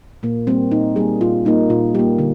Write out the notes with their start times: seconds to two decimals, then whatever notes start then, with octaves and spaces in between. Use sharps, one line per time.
0.23 A#2 A#3
0.47 G3 A#3 C4
0.72 A#2 D#4
0.96 G3 A#3 G#4
1.21 A#2 F4
1.45 G3 A#3 D#4
1.70 A#2 F4
1.94 G3 A#3 G4
2.18 D3